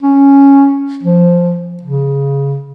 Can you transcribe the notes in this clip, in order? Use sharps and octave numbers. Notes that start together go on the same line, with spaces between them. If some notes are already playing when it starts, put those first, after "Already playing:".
C#4
F3
C#3